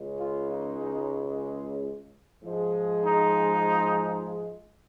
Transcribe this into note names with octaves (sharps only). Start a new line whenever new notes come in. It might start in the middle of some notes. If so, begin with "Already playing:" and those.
Already playing: C#2 C#3 G#3
F4
D#4
D#4
G#2 F3 G#3
D#4